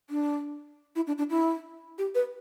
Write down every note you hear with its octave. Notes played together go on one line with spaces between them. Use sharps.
D4
E4
D4
D4
E4
G4
B4